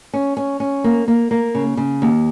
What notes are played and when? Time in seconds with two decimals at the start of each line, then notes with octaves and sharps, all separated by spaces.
0.13 C#4
0.37 C#4
0.60 C#4
0.84 A#3
1.08 A#3
1.31 A#3
1.55 C#3
1.77 C#3
2.02 D#2